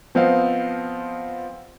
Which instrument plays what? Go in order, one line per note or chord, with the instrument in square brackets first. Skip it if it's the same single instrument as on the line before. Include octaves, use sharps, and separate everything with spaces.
[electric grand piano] F3 B3 C4 C5 D#5 F5